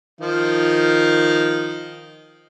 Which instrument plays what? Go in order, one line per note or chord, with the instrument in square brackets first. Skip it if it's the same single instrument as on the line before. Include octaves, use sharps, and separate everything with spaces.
[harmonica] D#3 F3 F5